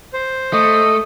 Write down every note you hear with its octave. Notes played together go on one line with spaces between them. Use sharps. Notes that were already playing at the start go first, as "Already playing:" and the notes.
C5
A3 D#5